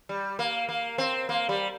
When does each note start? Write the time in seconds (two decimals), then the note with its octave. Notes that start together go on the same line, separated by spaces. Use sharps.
0.09 G3
0.39 A#3
0.69 A#3
0.98 C4
1.29 A#3
1.49 G3